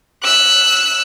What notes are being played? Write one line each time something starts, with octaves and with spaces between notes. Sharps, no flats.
E6 F#6